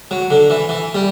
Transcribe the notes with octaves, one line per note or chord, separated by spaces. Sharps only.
F#3
D3
E3
E3
G3